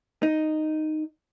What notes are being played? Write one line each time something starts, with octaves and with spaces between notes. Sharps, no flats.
D#4